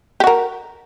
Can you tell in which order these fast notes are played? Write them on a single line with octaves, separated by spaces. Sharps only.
G4 F#4 A#4